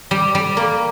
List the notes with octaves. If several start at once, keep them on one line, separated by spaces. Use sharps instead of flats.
G3
G3
A#3